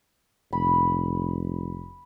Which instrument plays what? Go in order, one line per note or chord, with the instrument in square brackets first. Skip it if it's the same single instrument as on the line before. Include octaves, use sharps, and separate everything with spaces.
[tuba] F1 [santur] B5